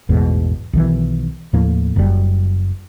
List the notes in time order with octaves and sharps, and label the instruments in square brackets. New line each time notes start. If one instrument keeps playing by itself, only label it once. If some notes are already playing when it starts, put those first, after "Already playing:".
[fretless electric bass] A1 E2 G#2 B2
B1 D#3 E3
D#2 A2 F3 A#3
F#1 F#2 C#3 G3